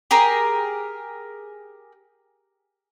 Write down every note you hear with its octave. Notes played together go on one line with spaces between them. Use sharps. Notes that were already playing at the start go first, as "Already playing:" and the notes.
G4 G#4 A#4